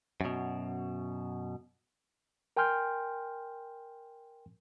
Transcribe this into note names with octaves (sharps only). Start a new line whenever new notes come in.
F#2 B2
A#4 G5 G#5 C6 F6 G6